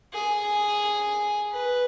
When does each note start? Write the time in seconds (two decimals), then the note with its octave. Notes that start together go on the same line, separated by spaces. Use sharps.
0.13 G#4
1.53 B4